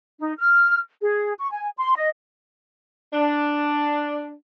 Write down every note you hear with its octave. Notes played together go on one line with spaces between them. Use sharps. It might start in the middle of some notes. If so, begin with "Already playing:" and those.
D#4
F6
G#4
C#6
G#5
C6
D#5
D4